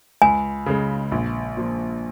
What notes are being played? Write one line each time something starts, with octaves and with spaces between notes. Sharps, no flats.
C#2 G#5
C#3 G#3
A#1
A#2 F3